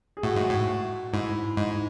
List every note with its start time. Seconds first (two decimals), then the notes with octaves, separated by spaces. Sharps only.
0.17 G#4
0.23 A2 F#4
0.36 G#2
0.50 A2
1.13 G#2 E4
1.57 G#2 D#4